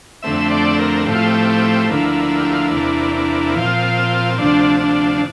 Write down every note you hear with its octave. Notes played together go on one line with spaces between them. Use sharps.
F2 D3 A3 C4 E5
D5
A#4
A2 F3 A3 C4 G4
F4
G4
D2 D3 F3 A#3 E4
G4
F4
E4
E2 C3 E3 A#3 D4
D4
A#2 F3 C4 F4
D2 C3 F3 D4
D4
D4